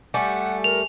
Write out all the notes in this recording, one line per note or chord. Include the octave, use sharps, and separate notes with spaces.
G3 A3 F#5 G#5
A#4 F7